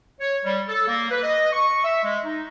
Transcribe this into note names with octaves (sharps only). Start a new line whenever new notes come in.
C#5
G3
A4
A#3
B4
D#5
C#6
E5
G#3
D#4